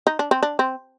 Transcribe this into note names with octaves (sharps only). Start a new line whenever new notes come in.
D#4
D4
C4
D4
C4